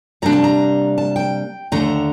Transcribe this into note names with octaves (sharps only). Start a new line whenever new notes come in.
C3 G3 A#3 D4 A#5
A5
A#5
A5
G5
D#2 D3 A3 A#5